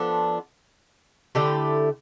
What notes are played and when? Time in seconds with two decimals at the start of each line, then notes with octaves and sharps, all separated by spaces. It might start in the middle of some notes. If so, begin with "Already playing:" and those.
Already playing: F3 B3 D4 A4
1.35 D3 A3 E4 G4